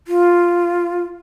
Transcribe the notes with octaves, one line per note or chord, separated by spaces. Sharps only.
F4